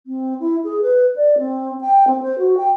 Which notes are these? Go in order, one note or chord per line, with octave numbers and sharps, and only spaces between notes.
C4
E4
G#4
B4
D5
C4
G5
C4
C5
F#4
G5